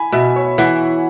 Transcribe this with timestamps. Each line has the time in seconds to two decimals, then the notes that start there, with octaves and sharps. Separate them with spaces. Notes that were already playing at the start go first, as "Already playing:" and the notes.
Already playing: E4 G#5 B5
0.12 B2 E5
0.36 C#5
0.58 E3 F#5